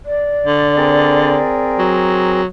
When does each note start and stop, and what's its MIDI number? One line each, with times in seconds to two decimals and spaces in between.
0.05 1.80 74
0.47 1.39 50
0.77 2.41 60
0.77 2.41 68
0.77 2.41 70
1.79 2.46 54